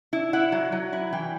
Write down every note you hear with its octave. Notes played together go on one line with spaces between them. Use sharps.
E4
E4 F#5
F#3
F#3
E4
E3 G5